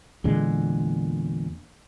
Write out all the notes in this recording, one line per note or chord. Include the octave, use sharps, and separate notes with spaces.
E2 A#2 D3 G#3